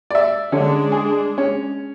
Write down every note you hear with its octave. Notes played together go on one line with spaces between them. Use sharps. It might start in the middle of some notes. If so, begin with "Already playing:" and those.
D5 E5
D3 G#3 C#4 D4
G#4
C#4